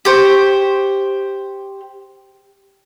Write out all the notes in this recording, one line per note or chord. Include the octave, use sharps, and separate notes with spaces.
G4 C5 C#6